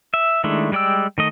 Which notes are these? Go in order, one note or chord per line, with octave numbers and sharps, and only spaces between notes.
E5
D#3 G#3 A3 D4 E4
G3 G#3 D5 G5 E6
D#3 A3 D#5